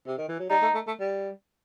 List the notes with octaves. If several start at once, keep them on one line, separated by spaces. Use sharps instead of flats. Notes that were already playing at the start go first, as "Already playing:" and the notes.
C3
D#3
E3
F#3
G3 D#4
A3
A3
A3
G3